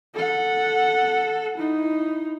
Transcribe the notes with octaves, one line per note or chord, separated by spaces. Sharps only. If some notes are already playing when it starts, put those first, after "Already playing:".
A4 F#5
D#4 E4